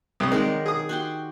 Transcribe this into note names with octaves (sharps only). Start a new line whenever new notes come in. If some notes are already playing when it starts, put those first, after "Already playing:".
C2 D#6
D#3 F#3 G#3 D5
G#4 D#6
F#4 G4 C6